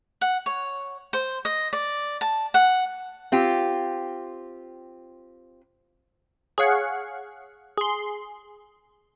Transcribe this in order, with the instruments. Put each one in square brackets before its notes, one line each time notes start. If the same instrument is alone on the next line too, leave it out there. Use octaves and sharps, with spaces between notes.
[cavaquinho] F#5
C#5
C5
D#5
D5
A5
F#5
[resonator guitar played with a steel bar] C4 F4 G4
[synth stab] G#4 C#5 F5 F#5
G#4 C6